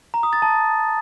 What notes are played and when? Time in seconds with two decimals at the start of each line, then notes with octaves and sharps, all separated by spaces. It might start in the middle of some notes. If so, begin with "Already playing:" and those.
0.14 A#5
0.23 D#6
0.33 A6
0.42 A5